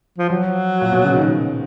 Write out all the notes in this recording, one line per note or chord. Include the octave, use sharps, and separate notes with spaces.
F3
F3 F#3
A#2
B2
C#3
D#3